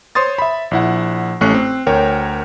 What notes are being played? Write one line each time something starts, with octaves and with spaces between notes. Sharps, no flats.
C5 C#5 C6 D#6 A6
E5 B5
A#1 E4 F#5
A1 A3 C#4 C#6 F#6 C7
C4
D2 A#4 C#5 G5